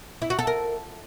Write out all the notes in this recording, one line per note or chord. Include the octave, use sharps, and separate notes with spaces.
E4
F#4
A4
A#4